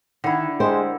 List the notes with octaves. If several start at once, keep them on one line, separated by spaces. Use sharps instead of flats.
D3 D#3 E4
G#3 G4 A#4 C5